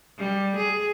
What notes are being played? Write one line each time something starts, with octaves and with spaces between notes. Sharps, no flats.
G3
G#4